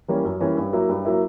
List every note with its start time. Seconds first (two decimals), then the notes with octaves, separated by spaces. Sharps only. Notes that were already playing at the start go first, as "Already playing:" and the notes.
0.08 E3 G3 A#3 C#4
0.25 F#2
0.40 E3 G3 A#3 C#4
0.57 G2
0.73 F#3 A#3 E4
0.89 G2
1.05 F#3 A#3 E4